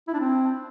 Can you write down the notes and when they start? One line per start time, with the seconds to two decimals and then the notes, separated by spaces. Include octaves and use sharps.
0.08 E4
0.14 D4
0.19 C4